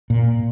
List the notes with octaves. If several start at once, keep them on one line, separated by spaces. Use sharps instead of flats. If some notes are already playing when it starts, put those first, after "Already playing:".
A#2